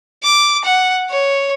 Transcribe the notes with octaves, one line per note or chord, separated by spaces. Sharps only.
D6
F#5
C#5